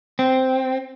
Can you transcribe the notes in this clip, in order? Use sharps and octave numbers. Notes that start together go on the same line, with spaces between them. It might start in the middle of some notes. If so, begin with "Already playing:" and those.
C4